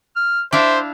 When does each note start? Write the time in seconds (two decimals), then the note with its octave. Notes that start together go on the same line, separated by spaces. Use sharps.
0.16 F6
0.53 D4 E4 C5 E5 F5